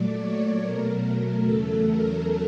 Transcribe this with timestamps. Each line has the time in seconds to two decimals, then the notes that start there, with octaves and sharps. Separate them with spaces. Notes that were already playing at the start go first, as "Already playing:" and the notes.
Already playing: A#2 F#3 A3 D5
0.17 C#5
0.59 B2 F#3 A3 A#4
1.43 E2 C#3 F#3 A3 A4
1.86 A#4